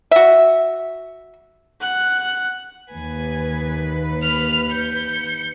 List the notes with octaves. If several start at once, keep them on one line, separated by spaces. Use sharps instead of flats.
F#4 E5
F#5 F#6
D#2 B4 G#5
B5 F6
G6 C#7